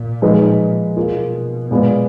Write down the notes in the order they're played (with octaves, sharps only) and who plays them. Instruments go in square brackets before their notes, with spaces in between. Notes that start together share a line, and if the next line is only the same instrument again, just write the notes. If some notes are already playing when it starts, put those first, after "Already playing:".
Already playing: [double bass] A#2
[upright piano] F3 G#3 D#4 G#4 B4
[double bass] B2 [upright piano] A#3 F4 G#4
[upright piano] A#2 G#3 B3